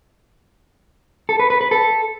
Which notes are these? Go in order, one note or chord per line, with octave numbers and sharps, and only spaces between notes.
A4
B4
B4
B4
A4